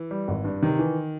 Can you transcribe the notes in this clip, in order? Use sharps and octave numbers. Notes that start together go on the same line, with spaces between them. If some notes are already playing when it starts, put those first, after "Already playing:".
Already playing: E3
G3
G#1
G2
C3 D#3
E3